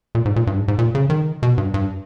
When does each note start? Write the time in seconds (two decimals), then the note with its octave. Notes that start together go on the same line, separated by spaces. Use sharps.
0.15 A#2
0.25 G#2
0.36 A#2
0.47 G2
0.57 G#2
0.68 G#2
0.79 A#2
0.95 C#3
1.10 D#3
1.43 B2
1.58 G2
1.74 G2